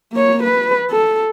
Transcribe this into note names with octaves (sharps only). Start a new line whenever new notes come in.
A#3 C#5
B4
A4